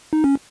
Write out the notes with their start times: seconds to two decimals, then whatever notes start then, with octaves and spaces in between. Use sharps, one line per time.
0.13 D#4
0.24 C#4